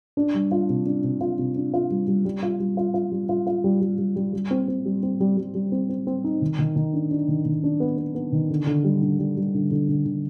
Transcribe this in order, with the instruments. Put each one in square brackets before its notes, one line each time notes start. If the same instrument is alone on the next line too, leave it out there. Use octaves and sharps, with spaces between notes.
[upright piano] D4
G3
F4
C3
D4
C3
F4
C3
D4
F4
G3
G3
G3
F4
G3
F4
F4
G3
F4
F4
G3
G3
G3
G3
G3
C4
C4
G3
C4
G3
G3
G3
C4
C4
C4
D#4
D#3
D#3
D#3
D4
D4
D#3
D#3
D4
B3
B3
B3
D#3
D3
D3
G3
D3
G3
G3
D3
D3
D3
D3